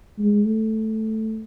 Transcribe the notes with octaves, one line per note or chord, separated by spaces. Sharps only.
G#3
A3